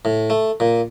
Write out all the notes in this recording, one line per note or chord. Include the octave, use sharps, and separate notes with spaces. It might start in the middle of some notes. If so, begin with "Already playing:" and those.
A2
A3
A#2